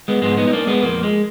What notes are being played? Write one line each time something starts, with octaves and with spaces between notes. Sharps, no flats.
G#3 B3
G#2 F3 G#3 B3
B3 D#4
D#4
A#3 D4
G#3 B3
F2 F3 A#3
G#3